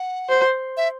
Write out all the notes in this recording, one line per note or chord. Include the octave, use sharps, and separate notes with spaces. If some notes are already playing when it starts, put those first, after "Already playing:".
Already playing: F#5
C5
E5